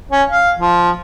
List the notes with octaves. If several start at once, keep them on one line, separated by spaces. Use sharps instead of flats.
C#4
F5
F3